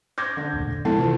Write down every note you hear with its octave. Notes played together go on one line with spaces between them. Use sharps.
D6 G6 G#6 A#6
D3
E1 D2 A#2
F3 G#3 A#3 B3 E4 A4 A5
C3 D#3 E3 F4